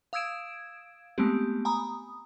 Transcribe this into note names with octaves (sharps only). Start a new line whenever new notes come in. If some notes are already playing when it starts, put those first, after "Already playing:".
F5 D#6 E6 G#6 D7 E7
G#3 A3 B3 C4 G4
G#5 A#5 B5 D#6